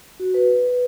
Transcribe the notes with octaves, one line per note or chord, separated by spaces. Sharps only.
F#4
B4
B4
B4